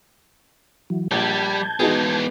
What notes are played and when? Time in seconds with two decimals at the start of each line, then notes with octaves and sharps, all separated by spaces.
0.90 E3 F#3
1.11 A#1 G3 A5 G6 G#6
1.80 G#3 B3 D#4 F#4 G#4